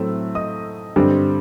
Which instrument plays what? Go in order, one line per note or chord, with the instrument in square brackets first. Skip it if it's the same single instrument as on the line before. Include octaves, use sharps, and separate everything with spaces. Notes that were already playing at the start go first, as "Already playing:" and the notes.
Already playing: [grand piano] A2 F#3 A3 C4 E6
D#5 D#6
G2 D3 G3 C4